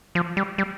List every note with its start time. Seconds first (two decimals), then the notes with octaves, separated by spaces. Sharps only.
0.15 F3
0.37 G3
0.58 G3